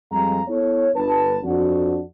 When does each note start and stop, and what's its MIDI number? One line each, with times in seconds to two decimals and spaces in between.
0.11 0.40 41
0.11 0.40 55
0.11 0.40 56
0.11 0.40 77
0.11 0.40 82
0.48 0.90 59
0.48 0.90 64
0.48 0.90 69
0.48 0.90 73
0.95 1.37 31
0.95 1.37 71
0.95 1.37 81
1.44 2.01 41
1.44 2.01 62
1.44 2.01 66